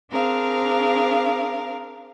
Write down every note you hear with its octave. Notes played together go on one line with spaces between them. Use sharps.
C4 D4 G#4 A#4 F5